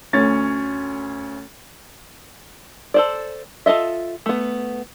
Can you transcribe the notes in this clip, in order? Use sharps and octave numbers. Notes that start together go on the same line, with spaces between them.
D2 C#4 C#5 A6
A4 C5 D5
F4 A4 D#5 E5
A3 B3